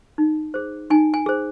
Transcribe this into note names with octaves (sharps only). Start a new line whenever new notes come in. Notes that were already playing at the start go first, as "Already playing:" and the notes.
D#4
G#4 C5
D#4 G#5
G#5
G#4 C5